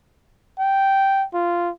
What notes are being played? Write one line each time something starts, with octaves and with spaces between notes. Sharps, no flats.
G5
F4